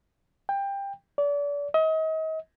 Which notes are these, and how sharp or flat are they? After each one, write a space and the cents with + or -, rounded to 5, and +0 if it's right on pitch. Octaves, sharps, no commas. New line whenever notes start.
G5 +20
D5 -35
D#5 +35